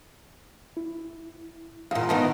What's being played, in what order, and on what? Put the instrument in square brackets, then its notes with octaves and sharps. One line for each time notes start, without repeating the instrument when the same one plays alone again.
[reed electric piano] E4
[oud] E2 A#2 [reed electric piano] F5
[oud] E2 D#3 B3 [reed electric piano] A5